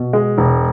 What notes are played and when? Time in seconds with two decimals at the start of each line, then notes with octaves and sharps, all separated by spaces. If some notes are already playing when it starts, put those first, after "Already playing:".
Already playing: B2
0.13 G#3
0.38 E1